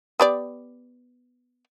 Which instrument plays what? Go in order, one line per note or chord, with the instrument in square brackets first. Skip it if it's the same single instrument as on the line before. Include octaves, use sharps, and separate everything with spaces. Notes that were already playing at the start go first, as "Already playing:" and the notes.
[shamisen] B3 G4 D5